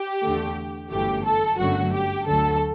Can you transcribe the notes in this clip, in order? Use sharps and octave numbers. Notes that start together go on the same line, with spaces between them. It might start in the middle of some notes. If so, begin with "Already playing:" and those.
Already playing: G4
E2 D3 A3
G1 F#2 E3 A3 G4
A4
G1 F#2 D3 F#3 A3 F#4
G4
D2 D3 F#3 A3 A4